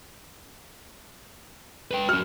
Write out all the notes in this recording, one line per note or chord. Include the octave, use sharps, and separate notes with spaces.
B4 G5
C#4 F#4 F6